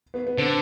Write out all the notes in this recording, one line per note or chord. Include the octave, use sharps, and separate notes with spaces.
B3
B3
D3 C4